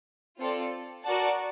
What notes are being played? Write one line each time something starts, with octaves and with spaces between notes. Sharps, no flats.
C4 F4 A4 D5
F#4 A#4 D5 F#5 A5